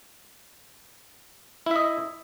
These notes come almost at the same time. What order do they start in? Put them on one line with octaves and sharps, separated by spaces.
E4 E5 D#5